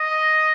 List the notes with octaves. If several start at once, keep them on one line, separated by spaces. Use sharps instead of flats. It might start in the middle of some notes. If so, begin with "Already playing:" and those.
Already playing: D#5